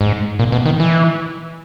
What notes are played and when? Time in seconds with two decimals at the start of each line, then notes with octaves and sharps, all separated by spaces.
0.01 G#2
0.39 A#2
0.52 B2
0.66 D#3
0.80 E3